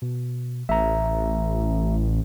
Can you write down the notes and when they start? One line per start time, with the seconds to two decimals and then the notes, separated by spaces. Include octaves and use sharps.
0.02 B2
0.69 A1 E5 A#5